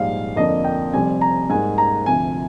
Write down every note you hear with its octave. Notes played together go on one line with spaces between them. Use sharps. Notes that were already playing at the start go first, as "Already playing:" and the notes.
Already playing: A#1 G#2 G3 F5
F2 D3 F3 A#3 D4 D#5
G5
F1 F2 C3 G3 C4 G#5
A#5
G#2 G3 A#3 G#5
A#5
D2 C3 F3 G#5